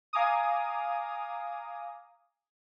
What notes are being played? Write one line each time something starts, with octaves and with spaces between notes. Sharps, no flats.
F5 G#5 A#5 D6 D#6